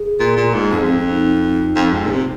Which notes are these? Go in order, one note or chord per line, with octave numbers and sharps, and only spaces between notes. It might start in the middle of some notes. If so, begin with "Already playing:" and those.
Already playing: G#4
A#2
A#2
G#2
F2 G#4
C4
C4
D#4
F2
G#2
A#2
C3